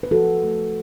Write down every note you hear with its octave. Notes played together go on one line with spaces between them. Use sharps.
B4
F3 F#4 A4
A3